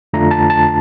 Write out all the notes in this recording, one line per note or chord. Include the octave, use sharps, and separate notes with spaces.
F2 D3 A3 D4 F4 A#5
A5
A5